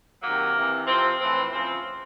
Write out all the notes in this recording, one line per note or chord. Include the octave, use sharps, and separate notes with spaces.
C3 D#3 F#3 A#3
C3 E3
C3 F3 C4
A2 E3 C4
C#3 F3 C4